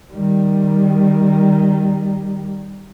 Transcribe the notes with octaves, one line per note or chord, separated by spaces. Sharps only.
D#3 G3